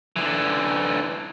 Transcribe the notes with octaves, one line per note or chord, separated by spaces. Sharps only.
D3 E3